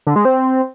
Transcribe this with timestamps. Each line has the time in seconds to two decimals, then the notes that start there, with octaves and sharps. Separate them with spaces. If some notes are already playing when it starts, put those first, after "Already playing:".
0.07 D3
0.16 G#3
0.25 C4